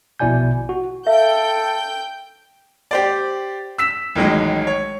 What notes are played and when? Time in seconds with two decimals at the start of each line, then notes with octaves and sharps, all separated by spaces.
0.19 A#1 B2 E4 D5 G#5 G6
0.69 F#4
1.07 A4 E5 F5 G5 G6
2.91 G4 C5 D5
3.78 E6 B6 E7
4.15 A1 D#3 F#3 G#3
4.67 C#5